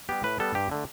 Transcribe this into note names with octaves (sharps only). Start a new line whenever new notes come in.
G3 B3 G4
A2 B4
G3 B3 A4
G2 G4
D3 A3